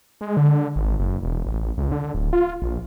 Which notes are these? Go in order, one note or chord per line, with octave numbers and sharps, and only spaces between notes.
G#3
D3
G#1
F#1
E1
A1
C#2
D3
D1
F4
A#1